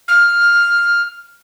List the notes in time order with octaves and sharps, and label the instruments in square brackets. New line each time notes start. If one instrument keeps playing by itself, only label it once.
[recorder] F6